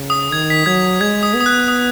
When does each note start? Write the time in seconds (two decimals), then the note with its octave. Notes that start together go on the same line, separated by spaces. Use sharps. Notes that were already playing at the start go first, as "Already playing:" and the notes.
Already playing: C#3
0.10 D#6
0.32 D#3 G#6
0.50 B6
0.66 F#3 G#6
1.00 G#3 G#6
1.23 D#6
1.35 B3
1.41 D#6
1.46 F#6
1.68 D#6